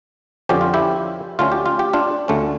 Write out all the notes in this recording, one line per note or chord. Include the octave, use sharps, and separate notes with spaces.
F2 D3 F3 C#4 G4
F4
E4 G4
D2 D3 A3 C#4 F4
G4
F4
G4
D4 F4
D2 D3 A3 C#4